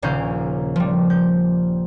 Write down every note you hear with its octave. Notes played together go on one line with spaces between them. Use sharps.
D#1 A#1 C#3 C#4 F5 G6
F3 G3
G6